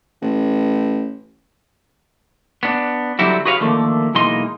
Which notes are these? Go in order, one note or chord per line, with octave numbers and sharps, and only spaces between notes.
A1
B3 D4
D3 F#3 G3 C4 E4 F#4
F#4 G#4 B4 C#5 F5
D3 D#3 F3 A3 A#3
B1 E3 G#3 A#3 D#4 C6